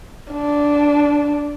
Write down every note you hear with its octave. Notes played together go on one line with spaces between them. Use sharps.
D4